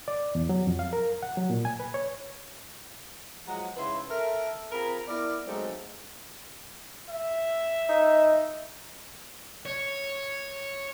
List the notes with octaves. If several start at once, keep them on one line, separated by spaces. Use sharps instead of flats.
D5
E2
F#3
F2
F5
A#4
F#5
F#3
A#2
G#5
B4
C#5
F3 F#3 G#3 F#4 F#5 A#5
G#2 C#3 E4 B4 C6
A4 A#4 E5
C4 F4 G#4 A#4 A#5 B5
B3 E4 A#4 D5
F#3 G#3 A3 C4 D#4
E5
D#4
C#5